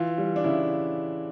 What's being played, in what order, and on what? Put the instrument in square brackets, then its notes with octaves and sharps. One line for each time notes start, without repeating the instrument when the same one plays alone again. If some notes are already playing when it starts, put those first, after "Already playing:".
Already playing: [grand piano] E3 F4
G3
D4
C#3 E4